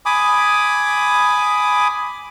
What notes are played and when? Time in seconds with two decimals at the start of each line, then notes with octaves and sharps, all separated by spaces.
0.06 G#5 B5 D6 D#6